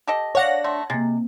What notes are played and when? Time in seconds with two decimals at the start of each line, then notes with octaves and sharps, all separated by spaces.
0.07 G4 A4 D#5
0.35 D4 C#5 D5 F5 F#5 A#6
0.64 A3 C6
0.90 C3 G#3 A#3 A6